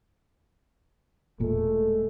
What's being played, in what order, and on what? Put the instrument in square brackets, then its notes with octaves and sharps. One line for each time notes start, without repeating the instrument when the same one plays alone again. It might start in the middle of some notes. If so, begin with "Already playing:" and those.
[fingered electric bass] E1 A#2 [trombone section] G#3 A3